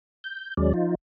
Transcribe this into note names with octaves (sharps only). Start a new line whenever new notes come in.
G6
D#2 F#3 G#3 C#4 D5
F3 D#4 F4